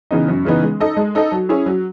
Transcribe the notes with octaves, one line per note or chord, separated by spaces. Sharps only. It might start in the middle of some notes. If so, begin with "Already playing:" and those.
C#3 E3 B3 D#4
F#2
C#3 E3 B3 D#4
G#3
D#4 A4 D#5
G#3
D#4 A4 D#5
F#3
C#4 E4 G#4
F#3